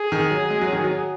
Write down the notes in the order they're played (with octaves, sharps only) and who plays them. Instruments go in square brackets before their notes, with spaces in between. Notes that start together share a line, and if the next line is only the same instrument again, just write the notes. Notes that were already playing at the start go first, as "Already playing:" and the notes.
Already playing: [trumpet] G#4
[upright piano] D#3
F#3
G#3
F#3
D#3
F#3